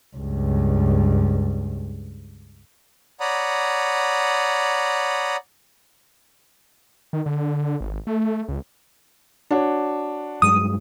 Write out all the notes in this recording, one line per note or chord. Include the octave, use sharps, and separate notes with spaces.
C#2 G2
C#5 D5 F#5 A#5 B5 D#6
D#3
D3
G#1
A3
C#2
D4 F#4 C#5
G2 F#3 G#3 D#6